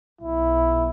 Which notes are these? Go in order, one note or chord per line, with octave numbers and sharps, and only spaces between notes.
B1 E4